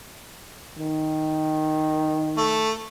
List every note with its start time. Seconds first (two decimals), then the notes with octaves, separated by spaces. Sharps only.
0.78 D#3
2.37 A3